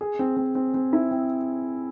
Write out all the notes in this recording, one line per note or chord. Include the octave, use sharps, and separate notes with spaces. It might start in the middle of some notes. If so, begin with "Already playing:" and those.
G#4
C4
C4
C4
C4
E4
C4